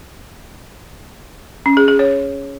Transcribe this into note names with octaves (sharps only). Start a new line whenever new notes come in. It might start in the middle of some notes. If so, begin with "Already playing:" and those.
C#4
G#4
G#4
C#5